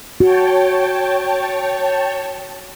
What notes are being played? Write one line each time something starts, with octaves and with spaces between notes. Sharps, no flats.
F#4 C#5 G5 A5